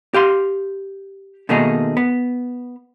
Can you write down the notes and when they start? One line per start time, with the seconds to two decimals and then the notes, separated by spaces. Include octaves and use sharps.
0.14 G4 F5 C6
1.49 B2 D#3 A3 A#3 D#4 G#4
1.97 B3